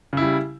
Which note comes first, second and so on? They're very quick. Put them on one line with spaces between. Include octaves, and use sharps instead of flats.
C#3 E4 G3